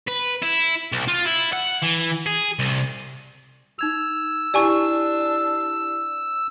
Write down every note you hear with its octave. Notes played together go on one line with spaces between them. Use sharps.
B4
E4
B1
F4
E4
F#5
E3
G#4
C2
D#4 E6 G#6 F7
D4 E4 G4 D5 G#5 C#6